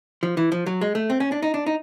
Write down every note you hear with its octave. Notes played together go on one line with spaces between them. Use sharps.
F3
E3
F3
F#3
G#3
A3
C4
C#4
D4
D#4
D4
D#4